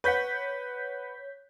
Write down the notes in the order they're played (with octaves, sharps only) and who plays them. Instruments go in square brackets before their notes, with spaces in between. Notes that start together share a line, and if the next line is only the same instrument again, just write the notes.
[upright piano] B4 F#5 [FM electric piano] C#5 G6 B6